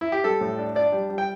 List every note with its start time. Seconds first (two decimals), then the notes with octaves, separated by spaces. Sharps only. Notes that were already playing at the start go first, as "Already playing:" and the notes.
0.01 E4
0.12 G4
0.24 G3 A4
0.41 A2
0.58 D4
0.75 D4 D5
0.92 G3
1.10 G3
1.18 G5